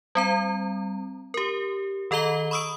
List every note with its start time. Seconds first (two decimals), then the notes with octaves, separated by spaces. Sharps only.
0.15 G3 C4 A#5
1.34 G4 A#4
2.11 D#3 A4 D#5 A#5 G7
2.51 B5 C#6 D#6 E6 D7